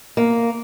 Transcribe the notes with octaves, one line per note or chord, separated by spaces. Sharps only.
A#3